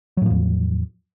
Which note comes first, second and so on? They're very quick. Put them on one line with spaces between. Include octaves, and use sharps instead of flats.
F#3 A2 F3 E2